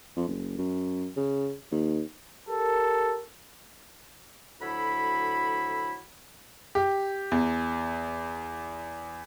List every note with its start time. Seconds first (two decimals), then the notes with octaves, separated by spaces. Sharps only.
0.17 F2
0.28 F#1
0.58 F#2
1.17 C#3
1.71 D#2
2.48 G4 A4 A#4
4.61 D2 F#3 E4 A4 B5
6.75 G4
7.32 E2